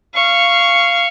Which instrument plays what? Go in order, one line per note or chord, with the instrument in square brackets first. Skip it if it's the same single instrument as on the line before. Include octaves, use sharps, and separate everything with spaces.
[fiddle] F5 C#6